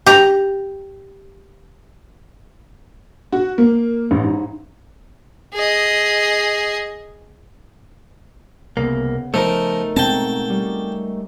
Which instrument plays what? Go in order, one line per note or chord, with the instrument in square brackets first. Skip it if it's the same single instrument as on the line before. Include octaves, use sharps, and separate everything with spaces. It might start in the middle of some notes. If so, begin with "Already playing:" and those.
[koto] G4 A#5
[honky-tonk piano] F#4
A#3
A1
G#2
[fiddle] G#4 D#5
[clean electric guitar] C2 A#3 [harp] C#3 B3
[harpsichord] F3 [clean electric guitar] A3 D#4 A#4
[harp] G#2 B2 [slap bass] C4 [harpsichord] G5 A5
[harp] G3 C#4